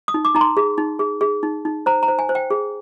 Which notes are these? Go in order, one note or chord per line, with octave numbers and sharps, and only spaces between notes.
D#6
D#4
D6
D#4 A#5
C6
G#4
D#4
G#4
G#4
D#4
D#4
C5 A#5
A#5
C5
G#5
C5
G5
G#4